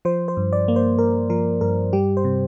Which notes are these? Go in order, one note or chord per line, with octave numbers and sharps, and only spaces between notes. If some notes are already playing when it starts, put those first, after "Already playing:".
F3 C5
C5
G2
D5
A#3
C5
G2 A#4
F3 A#4
G2 A#4
G3 G4
C5
C3